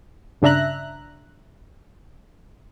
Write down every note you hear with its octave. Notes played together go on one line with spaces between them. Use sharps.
G2 C#3 D4 E5 A#5 F#6